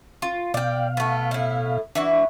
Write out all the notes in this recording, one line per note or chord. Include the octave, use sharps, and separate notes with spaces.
F4
B2 D5 F5 G5
A3 B3
A2 E4
E3 D4 E4 F#4